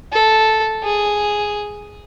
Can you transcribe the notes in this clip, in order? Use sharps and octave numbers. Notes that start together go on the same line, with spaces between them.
A4
G#4